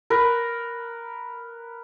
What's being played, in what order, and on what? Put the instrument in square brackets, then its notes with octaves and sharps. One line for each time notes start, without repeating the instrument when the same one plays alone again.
[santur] A#4 B4